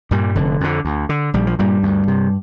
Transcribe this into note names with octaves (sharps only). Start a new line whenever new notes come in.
G2 A#2 G3
F1 D3
F2 D3
D2
D3
A#1 G3
F3
G2 A#2 G3
D2
C3